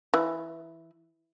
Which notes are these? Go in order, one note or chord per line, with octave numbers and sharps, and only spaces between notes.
E3